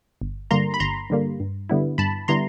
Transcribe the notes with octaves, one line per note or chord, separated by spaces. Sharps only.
G1
G2 D3 G3 A#3 A#5 C6
B5
G1 A#5 C6
G2 D3 G3 A#3
G2
D3 G3 B3 E4
G2 A5 B5
D3 G3 B3 E4 A#5 C6